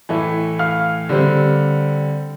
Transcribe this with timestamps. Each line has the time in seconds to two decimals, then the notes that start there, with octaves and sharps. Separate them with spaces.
0.09 A2 E3 A3
0.59 F5 F6
1.09 D3 G3 C4